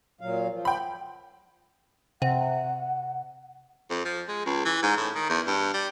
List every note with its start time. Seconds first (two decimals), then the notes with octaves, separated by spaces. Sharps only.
0.21 A#2 F#3 F5
0.50 F3
0.65 G5 B5
2.22 C3 F#5
3.90 F2
4.05 F3
4.28 G#3
4.46 C#2
4.65 E3
4.82 G#2
4.97 A2
5.15 D#3
5.29 E2
5.47 G2
5.74 G3